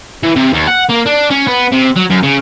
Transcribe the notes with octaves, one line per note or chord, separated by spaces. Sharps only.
E3
C3
D#2
F#5
A#3
D4
C#4
B3
C3
F#3
F#2
C#3